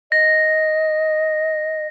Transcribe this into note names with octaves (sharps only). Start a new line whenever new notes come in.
D#5 A#6